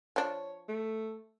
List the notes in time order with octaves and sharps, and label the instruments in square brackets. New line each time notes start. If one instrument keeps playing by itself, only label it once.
[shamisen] F3 D4 [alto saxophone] C#5
[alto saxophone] A3